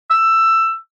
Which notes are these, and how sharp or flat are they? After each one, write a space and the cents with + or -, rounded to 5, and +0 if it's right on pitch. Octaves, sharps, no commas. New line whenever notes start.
E6 +15